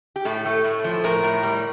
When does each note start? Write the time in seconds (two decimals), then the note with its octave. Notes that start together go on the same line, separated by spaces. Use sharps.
0.16 G4
0.25 A2 A4
0.45 A3
0.64 A2
0.84 F3
1.04 A2 A#4
1.24 A2
1.43 G3